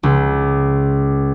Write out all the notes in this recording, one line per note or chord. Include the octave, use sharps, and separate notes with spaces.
C#2